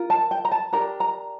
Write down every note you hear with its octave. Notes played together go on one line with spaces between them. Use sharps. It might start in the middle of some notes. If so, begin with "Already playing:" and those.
Already playing: F4 A#4
A5
G5
A#5
A5
D4 G4 A#4 A#5
A#5